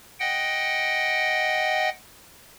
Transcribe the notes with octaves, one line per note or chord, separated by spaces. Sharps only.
D#5 F#5 G5